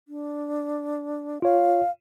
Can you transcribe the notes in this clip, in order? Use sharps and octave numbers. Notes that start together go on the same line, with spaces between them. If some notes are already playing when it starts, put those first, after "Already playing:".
D4
F4 C#5 F5